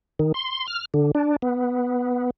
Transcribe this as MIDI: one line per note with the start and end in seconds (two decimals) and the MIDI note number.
0.19 0.32 51
0.34 0.67 84
0.68 0.85 89
0.94 1.11 50
1.15 1.36 62
1.42 2.30 59